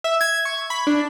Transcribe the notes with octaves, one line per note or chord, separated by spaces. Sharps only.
E5
G#6
C#6
B5
D4